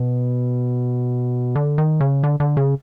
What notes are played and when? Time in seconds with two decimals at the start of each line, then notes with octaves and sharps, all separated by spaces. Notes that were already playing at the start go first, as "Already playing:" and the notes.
Already playing: B2
1.55 D3
1.78 D#3
2.00 C#3
2.23 D3
2.40 D3
2.57 C#3